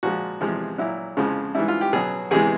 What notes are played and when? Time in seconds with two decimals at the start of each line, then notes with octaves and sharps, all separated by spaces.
0.03 A#2 F3 G#3 F#4
0.41 E2 C3 F3 G#3
0.78 A#2 F#3 E4
1.17 F2 C#3 F3 G#3
1.55 G#2 E3 G3 E4
1.68 F4
1.81 G4
1.93 B2 F#3 G#4
2.31 E2 C3 E3 G#3 G#4